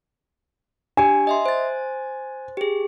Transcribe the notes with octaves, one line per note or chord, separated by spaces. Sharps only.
D4 G4 G#5
D#5 E5 C6
C5 A6
G4 G#4